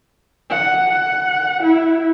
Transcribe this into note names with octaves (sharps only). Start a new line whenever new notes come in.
F#5
F#5
E4